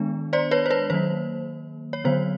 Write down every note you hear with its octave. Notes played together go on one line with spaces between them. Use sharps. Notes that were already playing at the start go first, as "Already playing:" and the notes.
Already playing: D#3 G#3 B3 D4
C5 D5
B4 C#5
C5
B4 C#5
D#3 F#3 A#3 C5
C#5
D3 F#3 B3 C5